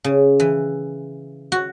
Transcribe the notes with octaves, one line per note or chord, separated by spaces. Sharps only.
C#3
E3
F#4